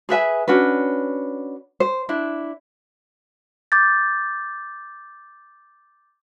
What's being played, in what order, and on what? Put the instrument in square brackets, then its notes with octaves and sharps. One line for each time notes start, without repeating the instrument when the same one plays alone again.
[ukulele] G#4 B4 E5 G#5
C#4 D4 F#4 B4
C5
D4 E4
[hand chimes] D6 G6 A6